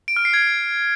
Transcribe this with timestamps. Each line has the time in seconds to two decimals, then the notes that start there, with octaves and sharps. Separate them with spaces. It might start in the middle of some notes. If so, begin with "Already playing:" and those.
0.08 D7
0.16 F6
0.25 C7
0.34 G#6